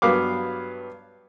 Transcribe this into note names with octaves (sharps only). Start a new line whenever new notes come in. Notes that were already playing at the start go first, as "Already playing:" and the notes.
G2 F#3 B3 F5 D6